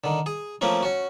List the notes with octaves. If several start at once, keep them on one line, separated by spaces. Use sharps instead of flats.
D3 D#3
G#4
F3 A3 A#3 C4 C#4 E4
C#4 F#4